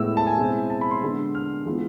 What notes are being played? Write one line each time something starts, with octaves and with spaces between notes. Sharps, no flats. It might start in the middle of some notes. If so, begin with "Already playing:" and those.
Already playing: A2 G#3 B3 E4 E6
A5
G#5
B2 G#3 C4 E4
A5
B5
C6
D3 G#3 B3 D4
F6
E3 G#3 B3 F4